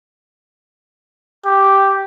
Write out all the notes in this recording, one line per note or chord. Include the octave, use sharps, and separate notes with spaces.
G4